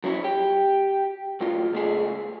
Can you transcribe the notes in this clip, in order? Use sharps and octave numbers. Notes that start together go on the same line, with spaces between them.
F#3 C#4 E4
G4
F#2 A2 F4
C#2 A3 G#4